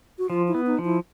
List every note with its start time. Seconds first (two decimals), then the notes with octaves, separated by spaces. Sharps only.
0.19 F#4
0.30 F3 F4
0.48 E4
0.55 B3
0.67 D#4
0.79 F3
0.85 E4